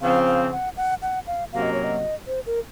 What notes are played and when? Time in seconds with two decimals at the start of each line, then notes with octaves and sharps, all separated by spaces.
0.01 C#3 F3 C4 F5
0.27 F5
0.52 F#5
0.77 F#5
1.02 F#5
1.27 F5
1.52 C3 F#3 A#3 C#4 F#4 F5
1.62 D#5
1.73 C#5
1.84 D#5
2.27 C5
2.46 A#4